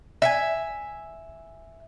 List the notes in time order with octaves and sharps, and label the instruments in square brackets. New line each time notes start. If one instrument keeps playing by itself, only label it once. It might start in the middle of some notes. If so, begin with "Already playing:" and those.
[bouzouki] E5 F#5 G#5